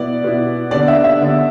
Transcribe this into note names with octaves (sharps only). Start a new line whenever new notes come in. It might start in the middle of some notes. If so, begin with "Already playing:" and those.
Already playing: B2 B3 E4 D5
B2 B3 E4
D3 B3 D4 D5
E5
E5
D3 B3 D4